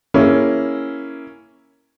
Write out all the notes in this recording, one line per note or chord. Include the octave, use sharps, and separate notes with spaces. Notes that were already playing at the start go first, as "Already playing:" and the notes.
A#3 C#4 E4 G#4